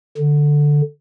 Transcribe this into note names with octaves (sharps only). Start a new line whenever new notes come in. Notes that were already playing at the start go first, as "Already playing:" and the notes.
D3